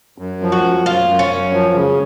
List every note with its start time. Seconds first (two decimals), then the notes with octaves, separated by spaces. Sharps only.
0.18 F#2
0.42 F3
0.52 F#4
0.63 F#2
0.86 F#2 F4
1.08 F#2
1.19 C#4
1.30 F#2
1.53 F3
1.74 C#3